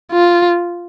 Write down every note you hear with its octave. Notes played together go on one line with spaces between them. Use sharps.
F4